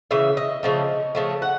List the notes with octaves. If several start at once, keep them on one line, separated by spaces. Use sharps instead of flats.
C#3 E3 E5
D#5
C#3 F3 A3
C#3 F3 A3
F#5